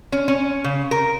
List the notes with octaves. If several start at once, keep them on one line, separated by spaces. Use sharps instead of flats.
C#4
C#4
C#3
A#4